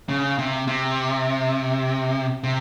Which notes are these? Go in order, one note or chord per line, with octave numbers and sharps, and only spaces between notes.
C#3
C3
C3
C3